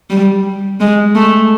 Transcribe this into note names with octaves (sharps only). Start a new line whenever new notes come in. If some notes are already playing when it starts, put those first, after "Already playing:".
G3
G#3
A3